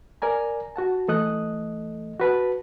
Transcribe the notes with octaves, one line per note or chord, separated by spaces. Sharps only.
A#4 D5 G#5 A#5
F#4 F#5 A5
E3 A3 A4 D#5 D#6 F#6
F#4 B4 A5